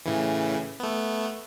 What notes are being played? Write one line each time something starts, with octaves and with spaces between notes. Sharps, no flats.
A2 C#3 E3
A3 B3